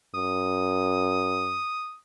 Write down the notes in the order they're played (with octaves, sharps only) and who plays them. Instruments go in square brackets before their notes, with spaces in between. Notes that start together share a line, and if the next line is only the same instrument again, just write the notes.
[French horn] F#2 [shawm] D#6